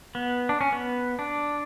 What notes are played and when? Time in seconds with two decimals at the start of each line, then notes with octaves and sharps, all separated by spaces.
0.15 B3
0.49 D4
0.61 C#4
0.72 B3
1.19 D4